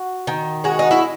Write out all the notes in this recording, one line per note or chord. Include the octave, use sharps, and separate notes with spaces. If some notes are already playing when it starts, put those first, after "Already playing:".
Already playing: F#4
D#3
G#3 F#4
D#4
E4